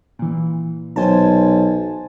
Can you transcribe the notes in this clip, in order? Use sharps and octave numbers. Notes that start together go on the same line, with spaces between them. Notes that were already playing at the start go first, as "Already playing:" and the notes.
A#2 E3
B1 C5 G#5 A5